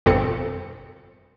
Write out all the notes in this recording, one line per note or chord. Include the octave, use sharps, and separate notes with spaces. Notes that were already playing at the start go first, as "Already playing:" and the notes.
G1 F2 B2 C4 A4 C#7